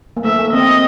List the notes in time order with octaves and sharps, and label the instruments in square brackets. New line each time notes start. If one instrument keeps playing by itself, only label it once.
[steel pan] A#3
[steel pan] A3 [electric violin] E5
[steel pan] A#3
[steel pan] C4 [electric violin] D#5